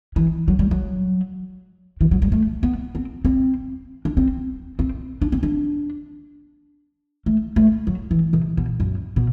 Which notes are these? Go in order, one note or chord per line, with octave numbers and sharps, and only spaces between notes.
E3
F#3
G3
F#3
E3
F#3
G3
A3
B3
C4
C4
D4
C4
C4
D4
C4
D4
A3
A3
F#3
E3
C3
B2
F#2
B2